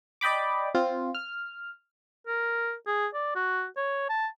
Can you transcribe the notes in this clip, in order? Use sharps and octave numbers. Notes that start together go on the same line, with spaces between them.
D5 D#5 G5 B5 D6
C4 F4
F6
A#4
G#4
D5
F#4
C#5
A5